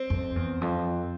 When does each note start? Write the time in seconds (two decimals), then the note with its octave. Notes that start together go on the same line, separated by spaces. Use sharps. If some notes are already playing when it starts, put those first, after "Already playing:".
Already playing: C4
0.10 F2
0.36 E2
0.61 F2